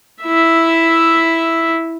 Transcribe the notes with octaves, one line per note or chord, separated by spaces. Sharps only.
E4 E5